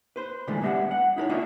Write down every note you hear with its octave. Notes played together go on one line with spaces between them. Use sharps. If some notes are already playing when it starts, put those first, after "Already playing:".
B4 C5
A#2 D3 E3 G#3 A3
G3 B3 D4 D#5 E5 F#5
F#5
D#4 E4 A#4 C#5
A#3 D4 F4 F#4 D#5 E5